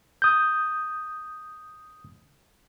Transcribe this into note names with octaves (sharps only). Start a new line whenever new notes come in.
D#6 G6